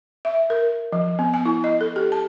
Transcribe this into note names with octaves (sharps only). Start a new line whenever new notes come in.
E5
A#4
F3
B3
G#5
E4
D#5
A4
G4
A5